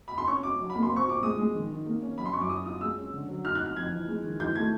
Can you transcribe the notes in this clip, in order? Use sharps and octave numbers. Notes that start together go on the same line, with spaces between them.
B5
C6
C#4 C#6
C#4 D6
F#3
B5
A#3
C6
C4
C#6
A#2 D6
G#3 D#6
G#3
D#3
D#3
A#3
C#4
F#2 B5
C6
F#2 C#6
D6
F4 D#6
F4 D#6
G#3 E6
C#4
D3
F#3
D#4 F6
F#6
D#4
F6
F2 G#6
E3
G#3
D#3
E3 G6
A3 G#6